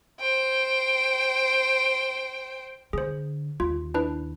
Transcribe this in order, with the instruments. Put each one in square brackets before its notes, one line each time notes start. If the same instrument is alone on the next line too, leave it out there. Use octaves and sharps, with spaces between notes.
[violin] C5 G5
[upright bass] D3 [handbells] G#4 C5
[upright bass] D#2 [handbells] F4
[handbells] D4 E4 B4